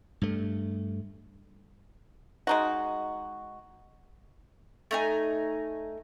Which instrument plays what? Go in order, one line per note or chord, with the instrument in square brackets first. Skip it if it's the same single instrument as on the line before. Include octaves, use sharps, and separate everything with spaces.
[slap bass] G2 A3
[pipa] G#3 D#4 F#4
[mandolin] A3 D#4 G#5